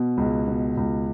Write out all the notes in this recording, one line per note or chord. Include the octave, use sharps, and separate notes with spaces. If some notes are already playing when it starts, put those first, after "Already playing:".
Already playing: B2
C#2
B2
C#2